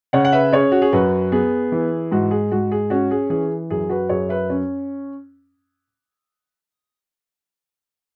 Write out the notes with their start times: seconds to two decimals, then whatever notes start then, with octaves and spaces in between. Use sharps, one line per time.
0.13 C#3 C#5 F#5
0.25 F#5
0.32 B4 E5
0.52 C#4 G#4 C#5
0.72 F#4
0.82 G#4
0.92 F#2 F#4 B4
1.32 B3 G#4
1.72 E3
2.11 G#2 F#4
2.31 G#4
2.52 G#2 F#4
2.71 G#4
2.90 C#4 F#4
3.11 G#4
3.30 E3 G#4
3.70 F#2 G#4
3.89 F#4 B4
4.09 F#2 G#4 C#5
4.29 B4 E5
4.50 C#4